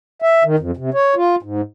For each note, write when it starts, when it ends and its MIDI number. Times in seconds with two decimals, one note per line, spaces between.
0.22 0.43 76
0.44 0.56 51
0.59 0.71 41
0.77 0.90 48
0.94 1.15 73
1.16 1.36 65
1.43 1.61 44